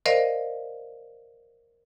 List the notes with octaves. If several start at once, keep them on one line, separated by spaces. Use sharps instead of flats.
A#4 C5 D5 D#5 F5